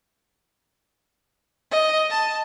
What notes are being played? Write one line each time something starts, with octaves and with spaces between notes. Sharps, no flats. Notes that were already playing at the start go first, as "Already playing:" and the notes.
D#5
A5